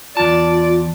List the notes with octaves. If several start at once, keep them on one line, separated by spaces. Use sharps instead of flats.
E2 F4 D5 A5